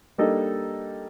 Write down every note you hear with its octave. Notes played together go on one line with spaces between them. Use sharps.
G3 A#3 D4 D#4 A4 D#5